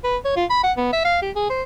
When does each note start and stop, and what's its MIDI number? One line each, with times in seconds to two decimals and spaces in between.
0.04 0.17 71
0.25 0.35 73
0.36 0.45 65
0.50 0.61 83
0.64 0.72 78
0.77 0.88 59
0.93 1.05 76
1.05 1.18 77
1.22 1.31 67
1.36 1.49 68
1.50 1.62 72